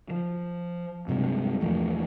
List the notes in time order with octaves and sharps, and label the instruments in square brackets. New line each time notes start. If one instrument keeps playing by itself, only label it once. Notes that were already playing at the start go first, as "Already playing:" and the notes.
[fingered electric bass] F3
G2 C3 F#3 G#3
A#1 E2 F3 A3